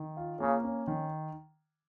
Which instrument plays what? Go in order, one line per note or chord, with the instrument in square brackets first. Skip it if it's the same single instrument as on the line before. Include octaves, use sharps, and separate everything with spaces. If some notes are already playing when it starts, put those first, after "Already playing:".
Already playing: [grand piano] D#3
F4
[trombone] C#3 [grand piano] A#3
[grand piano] C#4
D#3